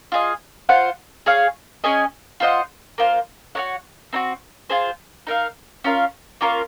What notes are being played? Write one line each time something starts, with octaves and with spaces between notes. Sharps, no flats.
F4 G#4 D#5
F4 C5 F#5
G#4 C#5 F5
C#4 G#4 D#5 G#5
F4 C5 D#5 F#5
A#3 F4 C5
F#4 A#4 C#5 F#5
C4 D#4 F#4
F4 G#4 C5
D#4 A#4 F5
C#4 F4 A#4 F5
A#3 C#4 F4 A#4